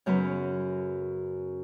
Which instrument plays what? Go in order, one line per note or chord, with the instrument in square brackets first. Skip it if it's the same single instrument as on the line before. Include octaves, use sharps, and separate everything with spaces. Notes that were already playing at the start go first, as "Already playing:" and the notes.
[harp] F#2 C#3 F#3 B3 B4